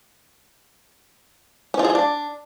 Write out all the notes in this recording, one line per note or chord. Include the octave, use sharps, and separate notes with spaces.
C#4
F4
G#4
F4
D4